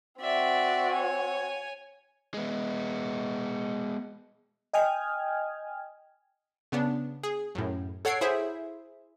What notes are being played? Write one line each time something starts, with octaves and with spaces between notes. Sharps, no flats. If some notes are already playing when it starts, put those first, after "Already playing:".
C4 F#4 D5 E5
C#5 G#5
G#3 B3
D#5 G5 G#5 D#6 F6 G#6
C#3 B3 D4
G#4
F#2 A2
A4 C#5 F#5 G#6 C7 D7
E4 G#4 C5 E5